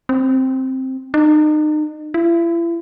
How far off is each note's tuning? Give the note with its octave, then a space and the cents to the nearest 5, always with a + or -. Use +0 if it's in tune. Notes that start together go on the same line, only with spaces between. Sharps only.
C4 +5
D#4 -35
E4 +40